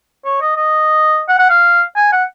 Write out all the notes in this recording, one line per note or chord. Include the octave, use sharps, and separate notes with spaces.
C#5
D#5
D#5
F#5
F#5
F5
G#5
F#5